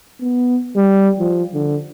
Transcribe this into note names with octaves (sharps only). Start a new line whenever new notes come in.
B3
G3
F3
D3